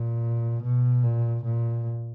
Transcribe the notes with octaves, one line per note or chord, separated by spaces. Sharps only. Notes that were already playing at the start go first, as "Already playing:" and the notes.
Already playing: A#2
B2
A#2
A#2